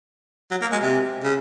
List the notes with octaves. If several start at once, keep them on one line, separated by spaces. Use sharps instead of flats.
F#3
A#3
G#3
C3
C#3